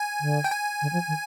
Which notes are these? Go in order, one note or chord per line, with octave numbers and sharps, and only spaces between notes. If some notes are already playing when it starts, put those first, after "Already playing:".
Already playing: G#5
D3
G5
G#5
D3
F3
D#3